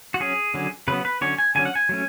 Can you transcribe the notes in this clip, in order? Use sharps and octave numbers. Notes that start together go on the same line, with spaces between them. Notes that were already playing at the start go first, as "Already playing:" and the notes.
F#4
F#3 C#4 G#4
D3 F#3 C#4
C#3 F#3 B3 B4
B4
D3 F#3 C#4 C#5
G#5
D3 F#3 C#4 G#5
F#5
G#5
F#3 A3 C#4